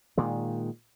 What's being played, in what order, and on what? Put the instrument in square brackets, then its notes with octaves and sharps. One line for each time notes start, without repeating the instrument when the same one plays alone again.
[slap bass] A#2 D#3 G#3